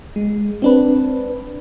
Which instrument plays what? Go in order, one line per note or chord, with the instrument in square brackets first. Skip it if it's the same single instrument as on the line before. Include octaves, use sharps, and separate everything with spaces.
[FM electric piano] G#3
C4 D4 B4